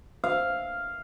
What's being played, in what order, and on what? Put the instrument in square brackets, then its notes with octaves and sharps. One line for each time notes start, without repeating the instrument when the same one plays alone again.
[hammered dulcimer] F5